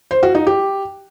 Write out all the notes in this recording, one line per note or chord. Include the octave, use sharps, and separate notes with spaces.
C5
F#4
D#4
G4